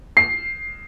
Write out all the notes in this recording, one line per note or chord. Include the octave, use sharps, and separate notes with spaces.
C7